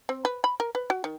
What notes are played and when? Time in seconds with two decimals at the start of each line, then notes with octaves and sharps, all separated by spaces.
0.09 C4
0.25 B4
0.44 B5
0.60 A#4
0.75 B4
0.90 F#4
1.04 D#3